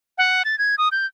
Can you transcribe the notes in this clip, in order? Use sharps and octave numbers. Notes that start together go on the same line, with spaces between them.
F#5
A6
G#6
D#6
G6